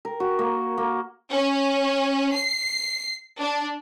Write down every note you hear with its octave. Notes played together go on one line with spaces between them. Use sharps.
A#4
F#4
A#3
A#3
C#4
C7
D4